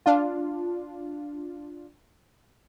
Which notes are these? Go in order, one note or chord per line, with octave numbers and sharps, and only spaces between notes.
D4 F4